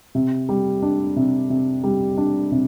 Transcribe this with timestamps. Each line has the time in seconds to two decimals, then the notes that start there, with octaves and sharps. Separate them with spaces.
0.15 C3
0.49 G3
0.82 D4
1.16 C3
1.50 C3
1.84 G3
2.17 D4
2.52 C3